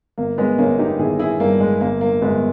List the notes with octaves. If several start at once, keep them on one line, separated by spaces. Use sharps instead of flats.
G1 A#3
G#3 B3
G1 A#3 C#4
D#4 G4
D#3 E4 G#4
E4 G#4
G2 A#3
G#3
G1 A#3
A#3
G1 G#3 B3